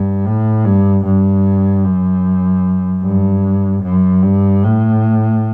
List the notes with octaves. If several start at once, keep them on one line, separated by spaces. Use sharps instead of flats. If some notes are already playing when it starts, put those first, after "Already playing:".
Already playing: G2
A2
G2
G2
F#2
G2
F#2
G2
A2